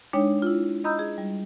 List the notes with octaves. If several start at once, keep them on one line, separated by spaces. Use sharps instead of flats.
G#3 D4 D#4 C#5 G5
E4 F4
D#5 A#5 B5 D#6 E6 G6
G#4
G3